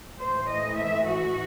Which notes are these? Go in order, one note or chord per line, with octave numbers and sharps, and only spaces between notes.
A2 E3 A3 C5
D#5
E5
F#4